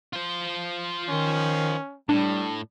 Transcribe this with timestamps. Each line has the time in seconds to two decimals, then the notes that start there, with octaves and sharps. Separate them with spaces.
0.13 F4 C5
1.09 D#3 C#4
2.09 A2 G3 D4 A5